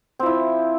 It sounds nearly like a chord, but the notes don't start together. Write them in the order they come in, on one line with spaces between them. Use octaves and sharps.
C4 F3 E4